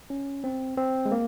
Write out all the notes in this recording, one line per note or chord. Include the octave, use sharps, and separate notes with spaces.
C#4
C4
C4
G#3
A#3